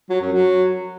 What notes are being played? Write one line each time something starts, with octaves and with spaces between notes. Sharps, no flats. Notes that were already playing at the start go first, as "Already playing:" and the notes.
F#3
F#2
F#3